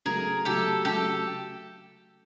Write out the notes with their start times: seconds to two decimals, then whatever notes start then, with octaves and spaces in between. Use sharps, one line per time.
0.05 C#3 F#3 A3 G#4 A#4
0.45 C#3 F#3 A3 G4 A4
0.85 C#3 F#3 A3 G4 A4